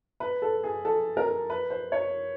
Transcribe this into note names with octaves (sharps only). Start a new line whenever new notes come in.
B4
A4
G#4
A4
A#4
B4
C5
C#5